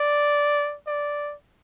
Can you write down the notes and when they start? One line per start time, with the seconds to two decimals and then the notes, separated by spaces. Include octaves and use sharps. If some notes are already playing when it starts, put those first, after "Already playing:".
Already playing: D5
0.87 D5